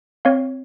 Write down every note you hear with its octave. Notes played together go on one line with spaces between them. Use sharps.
C4 C#5 F5